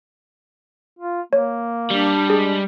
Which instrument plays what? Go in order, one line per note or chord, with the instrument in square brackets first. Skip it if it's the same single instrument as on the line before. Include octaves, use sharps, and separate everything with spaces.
[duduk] F4
[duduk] A#3 [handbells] C#5
[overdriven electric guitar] G3 [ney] D4
[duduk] G#3 [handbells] G#4